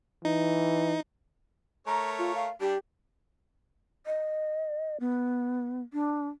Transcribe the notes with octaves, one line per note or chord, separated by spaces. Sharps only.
E3 D#4
A3 A#4 C#5 A#5
F4
F5
G3 D4 G4
D#5
B3
D4